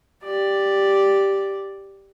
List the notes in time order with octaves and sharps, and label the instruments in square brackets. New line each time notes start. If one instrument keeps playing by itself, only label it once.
[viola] G4 D5